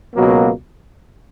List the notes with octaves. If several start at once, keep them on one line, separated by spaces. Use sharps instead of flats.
C#2 B2 F#3 A#3